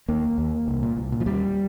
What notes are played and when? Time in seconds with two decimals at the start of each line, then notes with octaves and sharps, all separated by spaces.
0.09 D#2 A#3
0.38 D#2
0.68 C2
0.83 A#2
0.97 C2
1.12 A#2
1.20 F3
1.26 D#2 G3